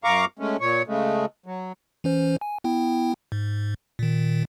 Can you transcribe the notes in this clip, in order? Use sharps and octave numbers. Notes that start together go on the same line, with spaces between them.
F#2 F5 A#5 C#6 D6
G#3 A3 C#4
A#2 C#5
C#3 G#3 A3
F#3
E3 C#4 C5
G#5
B3 E4 G5
G#2
A#2 D#3